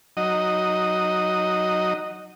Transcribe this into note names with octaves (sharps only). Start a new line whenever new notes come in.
F#3 D#4 D#5